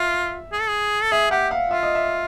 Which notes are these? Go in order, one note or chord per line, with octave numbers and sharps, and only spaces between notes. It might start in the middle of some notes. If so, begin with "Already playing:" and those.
Already playing: F4 E5
G#4
A4
G#4
A4
G#4 E5
G4 F#5
F5
F4 E5
D#5
E5